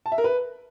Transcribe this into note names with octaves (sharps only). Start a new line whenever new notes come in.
A5
E5
A#4
B4